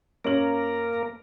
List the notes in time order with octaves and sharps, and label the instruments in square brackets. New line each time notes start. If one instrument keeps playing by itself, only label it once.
[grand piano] F#2 C#5 F#7 [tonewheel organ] A#3 A#4